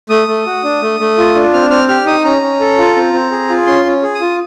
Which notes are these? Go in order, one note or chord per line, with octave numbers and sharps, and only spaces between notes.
A3 D#6
A3
F#4
D4
A3
A3
F4
D4
C4 F6
C4 F6
G4 F6
D#4 D#6
C#4 A#5
C#4
A4
F4
C4
C4
G#4
F4
C#4 C6
C#4
G#4
D#6
F4